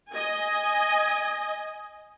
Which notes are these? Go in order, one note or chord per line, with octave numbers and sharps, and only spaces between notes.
D#5 G#5